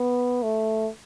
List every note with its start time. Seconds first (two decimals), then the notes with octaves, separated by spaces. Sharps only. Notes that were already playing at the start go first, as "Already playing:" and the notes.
Already playing: B3
0.43 A3